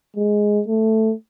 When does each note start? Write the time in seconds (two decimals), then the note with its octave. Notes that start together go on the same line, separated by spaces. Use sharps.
0.16 G#3
0.68 A3